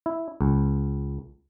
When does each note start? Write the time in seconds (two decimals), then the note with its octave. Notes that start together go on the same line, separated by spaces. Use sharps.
0.06 E4
0.41 C#2